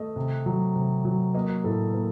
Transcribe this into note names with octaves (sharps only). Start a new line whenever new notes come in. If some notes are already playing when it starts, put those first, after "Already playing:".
Already playing: A3 D#5
C3
F#3
C3
F#3
A#3 D#5
A2 A4
A#3